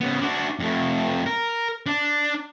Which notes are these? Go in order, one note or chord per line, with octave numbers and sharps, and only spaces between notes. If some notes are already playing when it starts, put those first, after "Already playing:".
C#3 B3
D4 F#4
F2 A3
A#4
D4